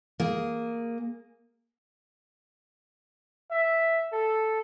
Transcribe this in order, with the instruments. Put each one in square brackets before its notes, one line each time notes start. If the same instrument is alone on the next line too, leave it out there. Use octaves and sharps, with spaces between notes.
[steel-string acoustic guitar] A#3 G#4
[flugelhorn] E5
A4